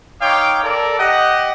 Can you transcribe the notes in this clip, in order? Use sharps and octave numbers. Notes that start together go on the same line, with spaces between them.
D#4 C#5 F5 G5 C6 D6
A4 A#4 D5
G4 D#5 F#5